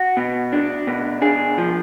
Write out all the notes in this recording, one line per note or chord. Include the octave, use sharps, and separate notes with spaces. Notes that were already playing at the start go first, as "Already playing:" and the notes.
Already playing: F#4
B2
D4
B2
D4 G#4
F3